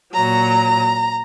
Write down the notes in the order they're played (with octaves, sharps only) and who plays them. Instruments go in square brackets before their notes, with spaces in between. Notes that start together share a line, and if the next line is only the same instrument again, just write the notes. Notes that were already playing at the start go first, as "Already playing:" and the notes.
[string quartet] A#2 F#3 A#5